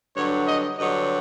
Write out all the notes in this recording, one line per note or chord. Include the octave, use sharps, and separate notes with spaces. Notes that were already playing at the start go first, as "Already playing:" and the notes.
G2 D3 F#3 C#5
D#5
G2 D3 F#3 D#5